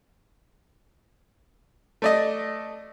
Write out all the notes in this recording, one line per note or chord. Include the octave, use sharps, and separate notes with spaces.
A3 D5 D#5